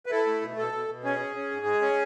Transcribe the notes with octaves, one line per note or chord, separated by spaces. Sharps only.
B4
E4 A4
A3
B2
B2 A4
B2
B2
C#4 G#4
C#4
C#4
G#2
G#3
C#4